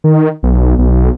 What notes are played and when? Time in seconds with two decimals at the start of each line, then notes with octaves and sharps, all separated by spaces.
0.04 D#3
0.43 B1
0.78 B1